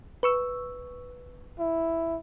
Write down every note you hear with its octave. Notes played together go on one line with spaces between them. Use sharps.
B4 C#6 E6
E4